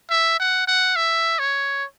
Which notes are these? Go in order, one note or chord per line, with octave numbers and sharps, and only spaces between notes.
E5
F#5
F#5
E5
C#5